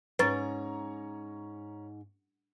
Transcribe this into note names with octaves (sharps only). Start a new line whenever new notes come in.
G#2 C#4 B4 A#5 C#6 A6